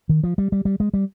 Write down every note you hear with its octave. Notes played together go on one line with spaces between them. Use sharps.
D#3
F3
G3
G3
G3
G#3
G3